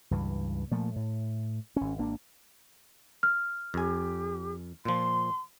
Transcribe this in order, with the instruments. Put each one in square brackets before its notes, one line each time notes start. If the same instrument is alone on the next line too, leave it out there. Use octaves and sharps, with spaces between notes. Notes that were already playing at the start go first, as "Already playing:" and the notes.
[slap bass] C#2 G2 E3
A#2 F3 A3
A2
G#1 C#4
G#1 A#3 D4
[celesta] F6
[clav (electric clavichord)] F2 G#5 [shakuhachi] G4
[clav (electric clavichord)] A#2 F3 [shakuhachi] C6